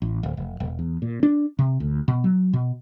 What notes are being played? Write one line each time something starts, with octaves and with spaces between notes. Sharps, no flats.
A1
D1
F1
E1
E2
A#2
D4
C3
D2
B2
F#3
B2